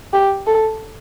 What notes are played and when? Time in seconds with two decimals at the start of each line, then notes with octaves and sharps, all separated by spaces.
0.13 G4
0.47 A4